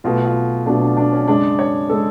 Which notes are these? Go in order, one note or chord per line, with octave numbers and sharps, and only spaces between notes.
B1 B2 A3 F4
F4
B1 B2 A3 D4
D4
D4
C#4
F#2 C#3 G#3 D4
C#5
C#3 G#3 A4